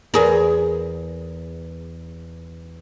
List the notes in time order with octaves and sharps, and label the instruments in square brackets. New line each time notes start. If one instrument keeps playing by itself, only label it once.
[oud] E2 G#4 A#4